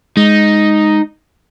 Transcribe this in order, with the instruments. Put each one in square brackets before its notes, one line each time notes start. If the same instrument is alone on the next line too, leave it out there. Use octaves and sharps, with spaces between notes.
[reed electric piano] G#3 [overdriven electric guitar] D#4